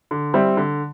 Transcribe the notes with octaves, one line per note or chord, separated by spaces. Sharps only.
D3
G3 C4 E4
D3